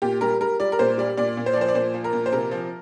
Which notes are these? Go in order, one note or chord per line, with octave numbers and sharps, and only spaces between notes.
A#2 G4
G3 A#4
G3 A#4
G3 D5
A#4
A#2 C5
G3 D5
A#2 D5
A#2
C5
F3 D5
C5
D5
A#2 C5
F3
A#4
A#2
C5
C3 A#4
F3